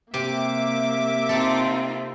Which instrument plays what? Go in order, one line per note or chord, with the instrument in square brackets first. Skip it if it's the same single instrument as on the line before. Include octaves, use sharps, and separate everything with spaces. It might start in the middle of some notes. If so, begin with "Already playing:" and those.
[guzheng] C3 G4 [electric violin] A#3 E5 [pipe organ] D6
[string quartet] C4 D#4 F4 [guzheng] A4